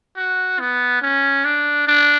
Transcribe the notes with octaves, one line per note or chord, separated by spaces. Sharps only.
F#4
B3
C#4
D4
D4